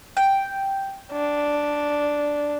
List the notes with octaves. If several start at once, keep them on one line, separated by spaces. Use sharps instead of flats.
G5
D4